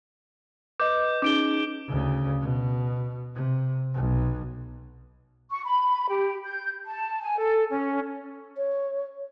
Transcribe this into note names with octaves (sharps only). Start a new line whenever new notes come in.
B4 D#5 D6 G6
C#4 D#4 G#4 D6 D7 G7
D2 C#3
B2
C3
B1
C#6
B5
G4
G6
A5
G#5
A4
C#4
C#5